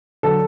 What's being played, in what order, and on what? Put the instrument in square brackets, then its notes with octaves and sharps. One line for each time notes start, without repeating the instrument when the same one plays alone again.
[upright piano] D3 F#3 A4